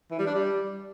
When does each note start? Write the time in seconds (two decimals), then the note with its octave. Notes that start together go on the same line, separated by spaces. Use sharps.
0.11 E3
0.19 G3
0.27 D4
0.34 G3